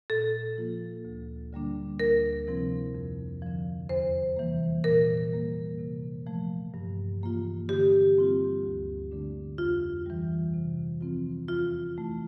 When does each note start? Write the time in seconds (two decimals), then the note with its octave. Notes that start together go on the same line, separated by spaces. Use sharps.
0.10 A#2 A4
0.58 F3 A#3 F4
1.05 D2
1.53 D3 G3 A#3 D4
1.99 D2 A#4
2.47 C3 F3 C4 E4
2.95 F2
3.42 D3 F3
3.89 E2 C5
4.36 C3 E3 G3 A#3
4.84 A#2 A#4
5.32 G3 A#3
5.79 C3
6.27 F3 A3
6.74 G2
7.21 E3 A#3 F4
7.69 D3 G4
8.16 G3 C4 F4
8.63 D2
9.11 D3 A3 D4
9.58 F2 F4
10.06 E3 G3
10.54 C3
11.01 F3 C4 F4
11.48 E2 F4
11.96 E3 A3 E4